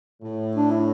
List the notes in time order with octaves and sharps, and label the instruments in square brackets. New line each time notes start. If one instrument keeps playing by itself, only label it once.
[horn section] A2
[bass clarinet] D4
E4